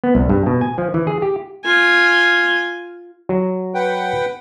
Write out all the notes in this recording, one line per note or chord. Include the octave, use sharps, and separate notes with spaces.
B3
C2
G2
B2
G#5
F3
E3
G#4
G4
F4 G#5
F#3
B4 F#5 G5